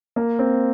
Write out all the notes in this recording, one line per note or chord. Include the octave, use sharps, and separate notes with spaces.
A#3
C4